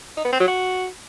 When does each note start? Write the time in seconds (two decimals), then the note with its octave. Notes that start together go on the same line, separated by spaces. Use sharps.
0.17 D#4
0.24 B3
0.32 C4
0.40 F#3
0.47 F#4